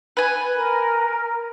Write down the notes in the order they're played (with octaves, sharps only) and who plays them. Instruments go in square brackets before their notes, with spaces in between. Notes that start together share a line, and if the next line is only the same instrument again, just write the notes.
[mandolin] B4 G#5
[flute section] A#4